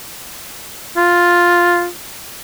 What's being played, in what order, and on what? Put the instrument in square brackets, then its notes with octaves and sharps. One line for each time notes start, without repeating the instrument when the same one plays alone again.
[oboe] F4